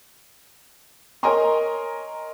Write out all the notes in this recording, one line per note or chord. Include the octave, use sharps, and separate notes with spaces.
A#4 C#5 D#5 G#5 A#5 C6